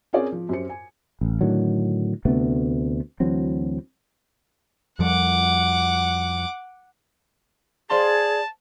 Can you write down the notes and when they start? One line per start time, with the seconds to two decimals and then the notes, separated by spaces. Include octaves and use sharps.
0.13 C4 C#4 G#4 A#4 C#5 D5
0.32 F3
0.49 F#2 G4 C5 C#7
0.69 G#5
1.21 A1
1.41 A2 D3 D#3 F#3
2.25 D2 C3 A3 B3
3.20 D2 E3 F#3 C4
4.99 F2 F3 G3 F#5 D6
7.90 G#4 C5 D5 F5 A5 C6